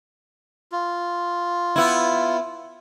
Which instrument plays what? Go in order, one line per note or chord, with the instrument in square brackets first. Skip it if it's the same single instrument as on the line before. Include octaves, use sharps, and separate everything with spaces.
[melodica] F4
[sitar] B3 E4